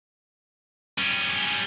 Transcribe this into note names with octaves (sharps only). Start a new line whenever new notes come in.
G3 C#4